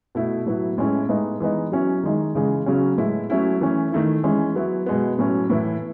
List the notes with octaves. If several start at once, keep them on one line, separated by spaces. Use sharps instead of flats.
B2 A3 E4
A2 F#3 B3 E4
A2 G#3 C#4 E4
A2 G#3 B3 D#4
E3 G#3 B3 D#4
F#3 C#4 E4
D#3 G#3 D#4
C#3 E3 G#3
C#3 F#3 C#4
A2 G#3 B3 E4
F#3 A3 C#4 E4
E3 A3 C#4
D#3 A3 E4
E3 G#3 C#4 E4
F#3 B3 E4
B2 G#3 B3
A2 F#3 C#4
A2 E3 B3 E4